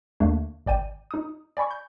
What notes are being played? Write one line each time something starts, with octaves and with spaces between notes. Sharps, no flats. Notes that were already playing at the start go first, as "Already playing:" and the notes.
D#2 D3 A3 A#3 D4
G#1 D5 G5 D#7
D#4 D#6
D5 G#5 B5 C#6
G6